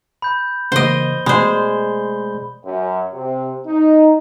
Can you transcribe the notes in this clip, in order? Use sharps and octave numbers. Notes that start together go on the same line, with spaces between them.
B5 G6
C#3 E3 A#3 C5 D#5 G7
B2 G#3 A3 C5 D5 B5
F#2
C3
D#4